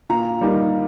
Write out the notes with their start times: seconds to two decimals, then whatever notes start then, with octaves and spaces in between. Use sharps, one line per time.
0.09 A#2 A#5
0.41 G3 A#3 D#4